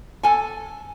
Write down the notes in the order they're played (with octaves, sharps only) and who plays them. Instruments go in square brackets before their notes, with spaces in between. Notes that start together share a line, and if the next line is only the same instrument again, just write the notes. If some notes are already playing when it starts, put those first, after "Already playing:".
[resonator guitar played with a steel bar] A4 G#5